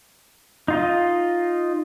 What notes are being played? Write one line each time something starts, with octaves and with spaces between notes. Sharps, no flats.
D#4 F4 D#5